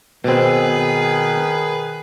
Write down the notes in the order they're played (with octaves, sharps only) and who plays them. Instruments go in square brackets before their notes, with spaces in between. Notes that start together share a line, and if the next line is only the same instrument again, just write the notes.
[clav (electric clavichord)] B2 C4 [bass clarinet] D#3 [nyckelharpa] G#4 B4